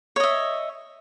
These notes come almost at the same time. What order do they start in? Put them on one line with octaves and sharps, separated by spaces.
C#5 D#5 E5